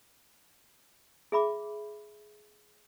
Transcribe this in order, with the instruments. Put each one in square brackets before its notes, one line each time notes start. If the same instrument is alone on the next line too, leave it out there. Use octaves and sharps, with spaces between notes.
[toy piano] G#4 E5 B5 D6